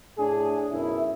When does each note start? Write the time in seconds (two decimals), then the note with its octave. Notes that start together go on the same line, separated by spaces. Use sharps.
0.18 A2 D4 G#4
0.71 B1 F#2 E4